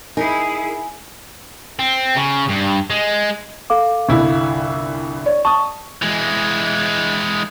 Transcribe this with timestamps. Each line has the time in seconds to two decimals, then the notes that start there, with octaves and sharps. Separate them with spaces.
0.17 D#4 E4 G#4 A#4 G#5
1.79 C4
2.17 C#3
2.49 G2
2.90 G#3
3.70 A4 F5 D6
4.09 G1 C2 E4
5.26 C#5 D5
5.45 A5 C#6 D#6
6.02 E3 G#3